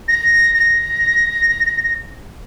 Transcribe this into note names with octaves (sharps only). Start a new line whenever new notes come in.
A#6
A#6